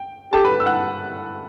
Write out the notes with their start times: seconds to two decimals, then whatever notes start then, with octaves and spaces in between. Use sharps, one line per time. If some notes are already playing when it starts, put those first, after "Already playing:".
Already playing: G5
0.33 G4 A4 A5
0.45 B4 B5
0.60 E6
0.66 F#5 F#6